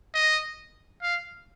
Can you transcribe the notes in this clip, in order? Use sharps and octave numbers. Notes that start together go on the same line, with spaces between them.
D#5
F5